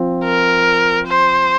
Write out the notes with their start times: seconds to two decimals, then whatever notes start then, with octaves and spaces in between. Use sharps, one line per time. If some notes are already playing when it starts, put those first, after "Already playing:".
Already playing: F3 C4 F4
0.24 A#4
1.07 C5